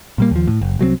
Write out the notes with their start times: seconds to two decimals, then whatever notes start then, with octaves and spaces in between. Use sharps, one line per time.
0.18 A#2 G3 A#3
0.31 D#2 F3
0.48 A2
0.61 F#1
0.79 C2 F#3 G#3 C4